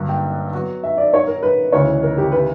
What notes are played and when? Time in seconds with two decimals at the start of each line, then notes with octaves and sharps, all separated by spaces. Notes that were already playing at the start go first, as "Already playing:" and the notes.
Already playing: G2 D3 F#3 A#3
0.09 G5
0.53 F#3 B3 F#4
0.83 E5
0.98 D5
1.13 C#5
1.27 A#4
1.43 B4
1.72 D2 C#3 E3 C#5
2.03 A#4
2.18 G4
2.32 B4